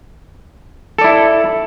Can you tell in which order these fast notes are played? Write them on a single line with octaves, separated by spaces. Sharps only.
A4 D5 E4